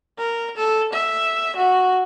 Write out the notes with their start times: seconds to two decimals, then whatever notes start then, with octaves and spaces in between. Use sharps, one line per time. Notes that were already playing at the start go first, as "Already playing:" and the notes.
0.18 A#4
0.56 A4
0.93 E5
1.56 F#4